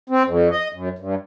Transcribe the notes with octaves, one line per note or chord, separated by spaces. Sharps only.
C4
F2
D#5
F#2
G2